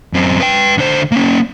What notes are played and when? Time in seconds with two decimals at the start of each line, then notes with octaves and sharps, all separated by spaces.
0.14 F#2 C4
0.40 B4 G5
0.78 D3 C5
1.12 A#3 C#4